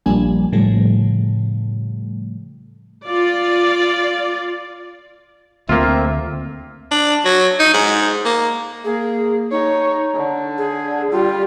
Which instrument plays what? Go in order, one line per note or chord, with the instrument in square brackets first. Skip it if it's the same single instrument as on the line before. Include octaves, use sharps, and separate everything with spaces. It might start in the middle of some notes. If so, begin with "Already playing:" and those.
[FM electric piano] A#1 F3 G3 A#3 D4 G#5
A2 C#3 F3 G3 A3
[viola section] F4 D5
[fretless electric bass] D2 [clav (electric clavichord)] A#3 F4 [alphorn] C4 [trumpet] E5
[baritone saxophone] D4
F#3
D#4
G#2
A#3
[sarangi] A#3 [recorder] G#4
[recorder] D#4 [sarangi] C#5
[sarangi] D3
[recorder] G#4
[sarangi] G3 [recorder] F4